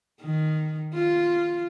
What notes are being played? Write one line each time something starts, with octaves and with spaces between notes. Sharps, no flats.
D#3
F4